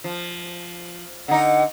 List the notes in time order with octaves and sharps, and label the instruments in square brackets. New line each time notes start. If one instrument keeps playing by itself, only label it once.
[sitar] F3
[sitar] D3 D#4 [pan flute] F#5